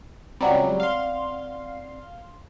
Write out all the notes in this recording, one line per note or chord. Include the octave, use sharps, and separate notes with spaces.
C#2 F#3 G3 C4 D5 F#5
F5 C6